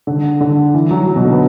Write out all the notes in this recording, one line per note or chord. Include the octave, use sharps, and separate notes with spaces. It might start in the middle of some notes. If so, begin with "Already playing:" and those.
D3
D3
E3
F#3
F#3
B2
D3
B3